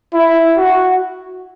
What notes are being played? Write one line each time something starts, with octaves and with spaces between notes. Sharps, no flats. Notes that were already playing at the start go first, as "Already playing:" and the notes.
E4
F#4